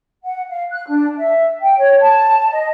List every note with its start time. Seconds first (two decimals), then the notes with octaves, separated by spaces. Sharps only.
0.24 F#5
0.48 F5
0.70 F#6
0.88 D4
1.16 E5
1.60 G5
1.78 C#5
2.01 A5
2.50 D#5